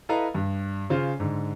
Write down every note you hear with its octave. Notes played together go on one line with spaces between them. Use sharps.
E4 A4 B4 D#5 F5 A#5
G2
C#3 F4 C5
G#2 D3